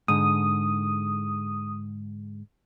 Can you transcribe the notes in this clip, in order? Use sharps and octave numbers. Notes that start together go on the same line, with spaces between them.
G#2 D3 D#6